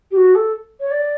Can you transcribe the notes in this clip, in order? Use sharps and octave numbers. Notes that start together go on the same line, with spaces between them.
G4
F#4
A4
C#5
D5